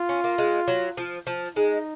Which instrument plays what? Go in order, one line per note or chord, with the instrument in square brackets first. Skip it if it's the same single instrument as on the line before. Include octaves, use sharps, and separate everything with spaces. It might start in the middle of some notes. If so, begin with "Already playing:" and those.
Already playing: [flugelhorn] F4
[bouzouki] C#4
A#3
G#3
F#3
F3
F3
[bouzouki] G#3 [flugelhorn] D#4